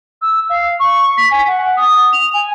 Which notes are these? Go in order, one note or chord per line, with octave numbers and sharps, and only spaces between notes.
E6
F5
C#6
B6
G#5
F#5
D#6
F7
G#5